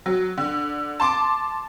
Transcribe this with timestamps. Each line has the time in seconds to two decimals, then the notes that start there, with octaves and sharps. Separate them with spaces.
0.06 F#3
0.38 D3
1.00 A5 C6 D6